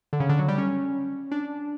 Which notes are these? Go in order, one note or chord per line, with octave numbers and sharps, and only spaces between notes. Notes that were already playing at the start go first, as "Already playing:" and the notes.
D3
C#3
D3
F#3
G3
C#4
D4